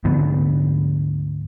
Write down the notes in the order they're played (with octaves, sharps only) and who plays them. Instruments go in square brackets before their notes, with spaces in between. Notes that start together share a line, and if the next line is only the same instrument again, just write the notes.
[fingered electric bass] D2 G#2 F3 B3